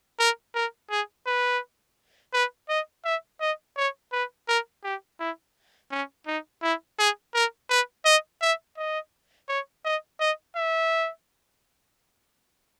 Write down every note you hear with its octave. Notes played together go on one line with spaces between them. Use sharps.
A#4
A#4
G#4
B4
B4
D#5
E5
D#5
C#5
B4
A#4
G4
E4
C#4
D#4
E4
G#4
A#4
B4
D#5
E5
D#5
C#5
D#5
D#5
E5